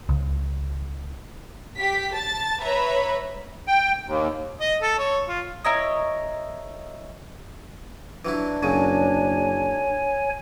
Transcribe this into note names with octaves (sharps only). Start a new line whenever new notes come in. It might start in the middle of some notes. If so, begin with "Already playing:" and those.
C#2
G4 B6
A5 A6
B4 C#5 E5 A#5 B5
G5
D#2
D#5
A4
C#5
F4
E4 A#4 C#5 D#5
E3 F#3 D4 E4
F#1 F#2 C#3 F#3 C#5 G#5